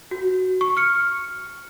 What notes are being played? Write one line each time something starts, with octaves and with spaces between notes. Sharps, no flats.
F#4
C#6
F6 C#7